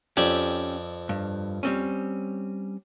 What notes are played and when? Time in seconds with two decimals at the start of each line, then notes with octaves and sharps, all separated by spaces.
0.17 F2 C#4 G4 D5 E5
1.09 G2
1.63 G3 C4 C#4